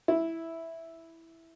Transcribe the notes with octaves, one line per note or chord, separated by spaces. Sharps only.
E4